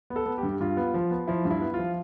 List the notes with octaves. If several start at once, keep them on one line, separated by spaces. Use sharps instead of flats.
B3
A4
B3
G4
G2
G2 F4
B3
F3
B3
F3 E4
G2
E4
B3
F4
F3